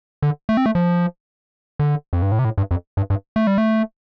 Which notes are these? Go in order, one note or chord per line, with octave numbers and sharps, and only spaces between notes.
D3
A3
C4
A3
F3
D3
F2
G2
A2
C3
A2
G2
F2
G2
G2
A3
G3
A3